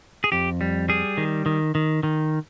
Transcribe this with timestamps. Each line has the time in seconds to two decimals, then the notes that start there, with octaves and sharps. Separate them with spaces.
0.24 G#4
0.32 F2 G4
0.61 G3
0.89 G3 G#4
1.17 D#3
1.46 D#3
1.75 D#3
2.03 D#3